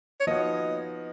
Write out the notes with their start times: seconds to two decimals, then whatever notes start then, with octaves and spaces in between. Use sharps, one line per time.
0.20 C#5
0.27 F3 B3 D#4 F#4 D#5